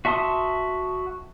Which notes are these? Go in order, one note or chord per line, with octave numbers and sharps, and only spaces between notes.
F#4 E5 A5 C6 D#6